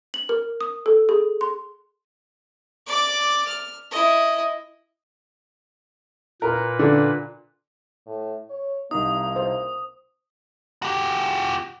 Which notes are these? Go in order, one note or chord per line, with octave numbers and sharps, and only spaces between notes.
F#7
A#4
D#6
A4
G#4
C6
D5 D6
F6
E4 D#5
A#2 A#4 B4
D3
A2
C#5
C2 A#3 D#4 D#6
C5
F#4 G4